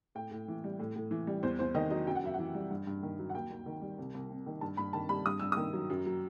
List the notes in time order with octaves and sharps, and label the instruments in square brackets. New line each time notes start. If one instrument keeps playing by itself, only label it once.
[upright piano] A2 G5
A2
E3
G3
A2
A2
E3
G3
E2 C5
E2 C5
D#3 D#5
F#3 D#5
F#2 G5
F#5
F#2 E5
E3 F#5
G3
G2
G2
D#3
F#3
F#5
D#2 G5
D#2
D#3
G3
C2
C2
C3
D#3
G2 A5
G2 B5
D#3 A5
G3 B5
G2 D#6
G2 E6
D#3 D#6
F#3
F#2
F#3